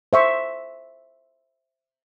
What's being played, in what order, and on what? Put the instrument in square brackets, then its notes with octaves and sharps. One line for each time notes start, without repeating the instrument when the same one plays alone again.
[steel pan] C5 E5 C#6